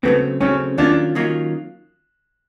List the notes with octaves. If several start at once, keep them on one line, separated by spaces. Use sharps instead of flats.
C#3 F#3 A3 B3 C4
C#3 F#3 A3 C4 C#4
D#3 F#3 A#3 C#4 D4 F4
D#3 F#3 A#3 C#4 F4